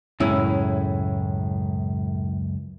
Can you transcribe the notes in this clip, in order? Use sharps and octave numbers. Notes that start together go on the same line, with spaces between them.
C#2 F#2 A2 G#3 C#4 E4